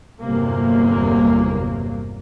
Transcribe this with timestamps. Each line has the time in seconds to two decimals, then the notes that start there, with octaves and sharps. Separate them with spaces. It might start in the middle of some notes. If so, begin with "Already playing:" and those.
0.22 G1 E2 C3 F#3 A#3